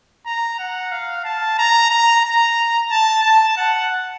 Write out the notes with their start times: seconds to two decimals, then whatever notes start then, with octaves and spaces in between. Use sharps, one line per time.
0.25 A#5
0.59 F#5
0.91 F5
1.24 A5
1.58 A#5
1.90 A#5
2.24 A#5
2.90 A5
3.23 A5
3.57 F#5